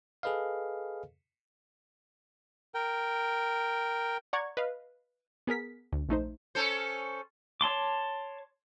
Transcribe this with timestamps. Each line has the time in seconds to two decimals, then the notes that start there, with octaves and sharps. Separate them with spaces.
0.23 G#4 A4 B4 D#5 F5
2.75 A#4 G5
4.33 D5 F#5 A#5 C#6 G#6
4.57 B4 D#5 F5
5.47 B3 G#4 A#4 B6
5.92 D2
6.09 A#1 A3 D#4 C5
6.55 C#4 A4 C5
7.61 C#5 A5 C6 D6